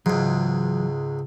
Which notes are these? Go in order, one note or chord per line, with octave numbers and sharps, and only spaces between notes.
C#2 G#2 E3 F#3